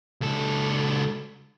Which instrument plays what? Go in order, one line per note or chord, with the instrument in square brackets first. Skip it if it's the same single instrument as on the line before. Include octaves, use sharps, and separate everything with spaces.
[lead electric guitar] C#2 A4